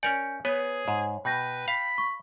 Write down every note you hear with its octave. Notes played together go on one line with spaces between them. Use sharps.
C#4 A#4 D5 G#5 G6 C#7
B3 G#4 B4 C#5
G#2
B2 B4 G5 G6 A#6
F5 B5
C#6